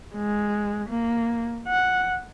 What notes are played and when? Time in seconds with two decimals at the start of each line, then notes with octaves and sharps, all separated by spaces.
0.15 G#3
0.89 A#3
1.67 F#5